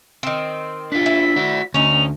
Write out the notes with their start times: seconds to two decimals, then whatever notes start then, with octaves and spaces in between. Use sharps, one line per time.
0.23 D#3 C4
0.92 D4 F4 B6
1.06 E4
1.36 F#4 D5
1.74 D2 C#4 D#4 F7